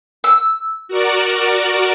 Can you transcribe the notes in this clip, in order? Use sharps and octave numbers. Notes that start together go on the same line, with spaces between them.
E6
F#4 A#4 D5